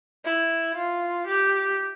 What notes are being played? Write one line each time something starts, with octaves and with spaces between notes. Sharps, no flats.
E4
F4
G4